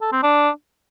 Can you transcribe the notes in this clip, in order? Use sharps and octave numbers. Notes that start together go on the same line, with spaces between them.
A4
C4
D4